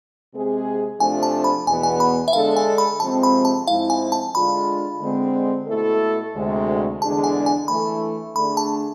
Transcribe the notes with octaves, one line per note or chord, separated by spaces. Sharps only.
C3 G#3 C4 G#4
C3 F3 A3 D4 F4 G#5
A5
B5
E2 B2 B3 G#5
G#5
B5
E5
D3 G#3 D4 A4 F5
G#5
B5
C3 F3 G#3 C4 A5
B5
A5
G#2 F3 G#3 C4 E4 F5
G#5
A5
D3 G#3 D4 F4 B5
D3 G#3 C4
B2 A3 E4 A4
D2 C3 G#3
E2 D3 G#3 D4 G#4 A5
G#5
G#5
E3 A3 E4 A4 B5
D3 A3 D4 G#4 B5
A5